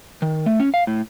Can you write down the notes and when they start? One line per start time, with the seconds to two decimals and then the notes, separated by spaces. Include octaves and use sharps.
0.22 D#3
0.46 A3
0.60 C#4
0.74 F5
0.87 A2